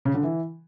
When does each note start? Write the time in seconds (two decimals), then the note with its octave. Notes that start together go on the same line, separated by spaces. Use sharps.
0.05 C#3
0.14 D3
0.23 E3